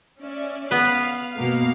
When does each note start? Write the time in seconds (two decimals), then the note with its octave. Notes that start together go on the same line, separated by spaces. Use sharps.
0.20 C#4 D5 E5
0.71 B3 B4 F5
1.33 B2 A#3 F5